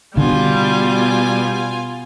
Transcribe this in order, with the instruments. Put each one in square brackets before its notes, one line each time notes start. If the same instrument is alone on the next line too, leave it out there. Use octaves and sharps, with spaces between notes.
[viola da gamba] B2 [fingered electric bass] D3 [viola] G3 [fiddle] F4 G#5